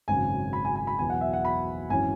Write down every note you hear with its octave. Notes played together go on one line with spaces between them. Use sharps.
G#1 F#2 C#3 G#5
B5
G#5
G#5
B5
E2 B2 F#3 G#5
F#5
E5
F#5
B5
G#1 F#2 E3 C#4 G#5